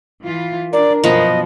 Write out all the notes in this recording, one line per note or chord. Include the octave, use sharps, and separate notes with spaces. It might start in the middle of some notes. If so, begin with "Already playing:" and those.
E3 F4
D4 A#4 D5
F#2 B2 F3 B3 D#5